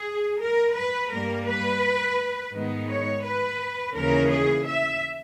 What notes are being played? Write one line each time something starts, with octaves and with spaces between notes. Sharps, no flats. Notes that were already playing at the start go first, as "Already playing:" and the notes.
Already playing: G#4
A#4
B4
G2 G3 A#3 A#4
B4
G#2 D#3 G#3 B3 D#4
C#5
B4
D#2 C#3 E3 A#3 C#4 A#4
G#4
E5